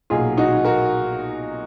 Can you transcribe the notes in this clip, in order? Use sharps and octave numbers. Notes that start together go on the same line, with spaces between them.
B1 A#2 F#3 F4 G#4
D#4 F#4
F#4 A#4